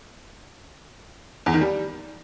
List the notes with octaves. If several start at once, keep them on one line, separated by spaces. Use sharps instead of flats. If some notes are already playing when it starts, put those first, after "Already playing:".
E2
D#3
G3